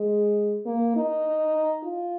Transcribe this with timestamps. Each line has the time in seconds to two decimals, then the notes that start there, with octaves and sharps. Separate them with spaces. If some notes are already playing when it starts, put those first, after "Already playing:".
Already playing: G#3
0.66 A#3
0.96 D#4
1.85 F4